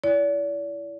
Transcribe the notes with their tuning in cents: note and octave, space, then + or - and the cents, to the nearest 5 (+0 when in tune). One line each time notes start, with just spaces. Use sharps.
E4 +15 D5 -40